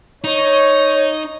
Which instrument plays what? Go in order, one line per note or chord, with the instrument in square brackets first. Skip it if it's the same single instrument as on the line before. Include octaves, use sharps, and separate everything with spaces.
[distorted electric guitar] D#4 [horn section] C#5